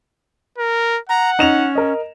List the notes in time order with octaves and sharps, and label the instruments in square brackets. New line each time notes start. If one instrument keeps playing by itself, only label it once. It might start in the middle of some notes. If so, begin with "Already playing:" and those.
[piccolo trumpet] A#4
[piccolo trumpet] F#5 [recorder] A#5
[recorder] C#4 [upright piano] D#4 E7 F7
[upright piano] A#4 D#5